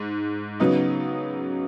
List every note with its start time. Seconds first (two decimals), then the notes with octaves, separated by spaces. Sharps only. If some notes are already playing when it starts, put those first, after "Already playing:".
Already playing: G#2
0.60 C#3 F#3 B3 D#4